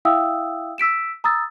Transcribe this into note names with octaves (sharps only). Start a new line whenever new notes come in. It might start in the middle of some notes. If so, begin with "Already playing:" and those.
E4 E5 F5 G5 D#6 E6
E6 B6 D7 E7
A#5 D#6 E6 A6